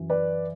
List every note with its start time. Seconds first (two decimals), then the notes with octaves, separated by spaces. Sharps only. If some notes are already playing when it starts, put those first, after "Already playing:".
Already playing: F#2 E3
0.10 B4 D5